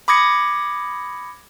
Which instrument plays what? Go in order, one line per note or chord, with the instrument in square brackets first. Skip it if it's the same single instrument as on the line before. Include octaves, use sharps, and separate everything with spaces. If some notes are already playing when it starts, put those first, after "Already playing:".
[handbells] B5 D6 D#6 G#6 A#6 C#7